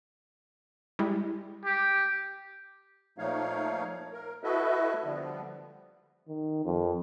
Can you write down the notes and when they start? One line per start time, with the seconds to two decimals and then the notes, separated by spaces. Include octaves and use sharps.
0.99 G3 G#3 E4
1.65 G4
3.18 A#2 F3 A3 D#4 C#5 F5
4.13 A#4
4.43 E4 F#4 A4 B4 D#5 E5
5.04 D3 F3 G3 B3
6.28 D#3
6.65 F2